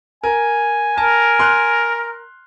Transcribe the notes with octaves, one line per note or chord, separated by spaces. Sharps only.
A#4 G#5
A#4 A5
C6 F6 F#6